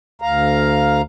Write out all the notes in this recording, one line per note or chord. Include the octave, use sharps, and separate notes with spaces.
D2 F5 A#5